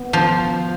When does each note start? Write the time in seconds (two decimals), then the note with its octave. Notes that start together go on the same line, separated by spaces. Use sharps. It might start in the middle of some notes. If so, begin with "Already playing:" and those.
Already playing: B3
0.13 F3